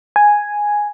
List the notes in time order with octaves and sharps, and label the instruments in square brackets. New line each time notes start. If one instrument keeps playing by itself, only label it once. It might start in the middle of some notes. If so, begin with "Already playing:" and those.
[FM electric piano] G#5